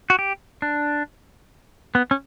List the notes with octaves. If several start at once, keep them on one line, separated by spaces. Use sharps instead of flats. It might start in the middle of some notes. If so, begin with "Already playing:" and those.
F#4
G4
D4
B3
C#4